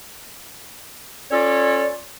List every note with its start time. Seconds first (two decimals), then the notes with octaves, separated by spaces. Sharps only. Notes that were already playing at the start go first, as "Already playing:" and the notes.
1.31 C#4 F4 A4 C#5 D5